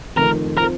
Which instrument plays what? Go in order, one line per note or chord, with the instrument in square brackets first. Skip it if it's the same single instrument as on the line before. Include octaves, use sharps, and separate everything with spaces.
[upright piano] F1 F2 D#3 [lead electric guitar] A#4
[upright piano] F3 C4 [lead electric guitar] A#4